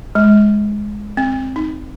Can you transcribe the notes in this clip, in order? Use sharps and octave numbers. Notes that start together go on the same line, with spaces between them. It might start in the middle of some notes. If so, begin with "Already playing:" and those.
G#3
C4
D#4